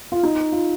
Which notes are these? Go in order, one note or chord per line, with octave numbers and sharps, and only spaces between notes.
F4
D#4
F4